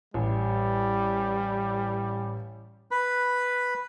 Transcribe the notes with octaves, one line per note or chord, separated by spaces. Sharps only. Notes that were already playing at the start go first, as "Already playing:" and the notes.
A1 G3
B4 B5